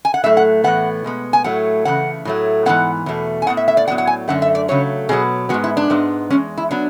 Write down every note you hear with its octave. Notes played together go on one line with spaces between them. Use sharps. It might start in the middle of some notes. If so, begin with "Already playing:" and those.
G#5
F#5
A2 F#3 A3 E5
F#5
A2 E3 G#3 B3 F#5
B2 G#3 B3
G#5
A2 F#3 A3 F#5
C#3 E3 A3 F#5
A2 F#3 A3
G#2 E3 G#3 B3 F#5
E2 B2 A3
G#5
A2 G#3 B3 F#5
E5
E5
D5
A2 F#3 B3 F#5
F#5
G#5
F#2 D3 A3 F#5
E5
D5
C#3 F#3 A3 C#5
B2 F#3 B3 G#4
G#2 G#3 B3 F#4
E4
D4
G#2 G#3 B3
E2 C#3 G#3 C#4
E4
F#3 B3 D4